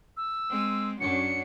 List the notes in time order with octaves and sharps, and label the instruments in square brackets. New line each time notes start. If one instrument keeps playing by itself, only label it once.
[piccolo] E6
[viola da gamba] G#3 C4
[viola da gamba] F#2 F#3 D4 [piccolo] C#7